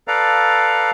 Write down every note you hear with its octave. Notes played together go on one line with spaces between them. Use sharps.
A4 B4 D5 F5 A#5